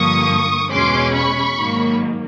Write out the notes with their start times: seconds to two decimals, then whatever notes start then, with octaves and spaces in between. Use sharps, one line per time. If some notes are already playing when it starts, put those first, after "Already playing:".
Already playing: G2 D3 F3 A#3 C#6 D#6
0.72 E2 B2 G#3 C#4 C6 D6
1.14 B5 C#6
1.58 G#2 D#3 F#3 A#3